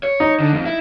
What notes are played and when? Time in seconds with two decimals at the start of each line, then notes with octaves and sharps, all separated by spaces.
0.03 C#5
0.20 D#4
0.40 D3
0.53 F2
0.65 E4